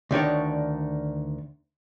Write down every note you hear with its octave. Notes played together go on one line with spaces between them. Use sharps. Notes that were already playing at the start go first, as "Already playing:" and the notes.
D2 D#3 D4 C#5